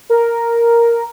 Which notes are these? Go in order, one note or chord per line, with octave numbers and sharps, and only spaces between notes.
A#4